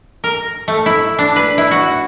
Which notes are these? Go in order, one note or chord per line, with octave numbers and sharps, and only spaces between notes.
A#4
A3
E4
D4
B4
E4
F#4